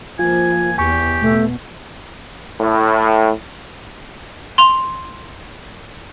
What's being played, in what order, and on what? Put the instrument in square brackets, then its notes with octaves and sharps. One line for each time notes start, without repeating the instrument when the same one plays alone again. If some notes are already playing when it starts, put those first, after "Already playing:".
[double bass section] F3 A#3 [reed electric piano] F4 [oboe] G#5
[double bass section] E2 [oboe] G4 [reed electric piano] G#5 C#6
[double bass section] B2 [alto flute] A3
[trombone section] A2
[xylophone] C6 F7